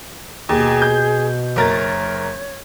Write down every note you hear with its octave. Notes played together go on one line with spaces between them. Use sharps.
D#2 B2 G#4
G6
F#1 A#4 C#5 A6